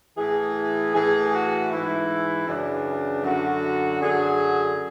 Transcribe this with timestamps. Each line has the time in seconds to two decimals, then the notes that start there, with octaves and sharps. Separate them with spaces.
0.17 A2 E3 G#4
0.94 A2 E3 G#4
1.32 F#4
1.70 G#2 E3 E4
2.47 F#2 C#3 E3 D4
3.23 F#2 D3 F#3 F#4
4.00 F#2 D3 F#3 G#4